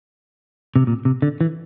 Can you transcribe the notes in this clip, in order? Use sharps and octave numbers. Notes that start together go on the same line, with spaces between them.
C3
A#2
C3
D3
E3